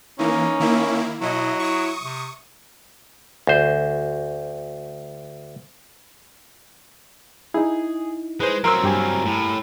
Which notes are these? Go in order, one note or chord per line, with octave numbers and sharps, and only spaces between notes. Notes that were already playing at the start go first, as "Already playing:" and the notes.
E3 A#3 C#4 D#4
D#3 A#3 E4
B2 F#3 E4 D#5
E4 C#6 D#6
C3
D2 C5
D#4 E4 G#4
G#3 B4 C5
F#3 C4 A#4 C6 E6
G2 G4 G#5
A2